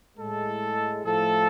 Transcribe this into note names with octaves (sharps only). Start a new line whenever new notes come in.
A2 G#3 A4
A2 F3 A3 A4